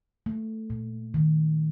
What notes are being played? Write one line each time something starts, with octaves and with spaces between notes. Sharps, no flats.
A3
A#2
D#3